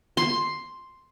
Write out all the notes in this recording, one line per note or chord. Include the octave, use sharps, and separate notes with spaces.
C6